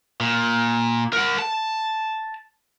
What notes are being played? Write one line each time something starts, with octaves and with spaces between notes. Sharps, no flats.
A#2
A#4 F#5
A5